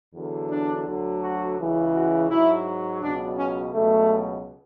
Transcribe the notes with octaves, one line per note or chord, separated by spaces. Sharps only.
E2 D3 F#3
D4
D2 D3 F#3
F#4
C#2 C#3 E3
F#4
G#2 F#3 E4
C#2 B2 F#3 D4
C#4
C#2 B2 F#3 A3